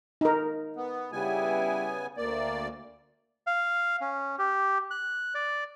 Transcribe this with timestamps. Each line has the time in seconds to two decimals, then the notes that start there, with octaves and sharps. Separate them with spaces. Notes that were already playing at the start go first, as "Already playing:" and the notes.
0.21 D#4 A#4
0.76 B3
1.12 C#3 G3 B3 E4 G4 G#5
2.17 D2 A#3 D5
3.47 F5
4.01 C#4
4.39 G4
4.91 F#6
5.35 D5